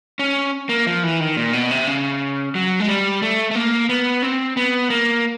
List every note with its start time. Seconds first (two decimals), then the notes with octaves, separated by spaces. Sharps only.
0.19 C#4
0.69 A#3
0.87 F3
1.03 E3
1.20 D#3
1.37 A#2
1.53 B2
1.71 C3
1.87 C#3
2.55 F#3
2.80 G#3
2.88 G3
3.22 A3
3.51 A3
3.55 A#3
3.89 B3
4.23 C4
4.57 B3
4.90 A#3